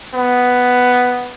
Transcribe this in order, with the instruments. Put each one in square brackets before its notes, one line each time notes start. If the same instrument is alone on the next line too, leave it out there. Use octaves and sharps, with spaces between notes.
[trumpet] B3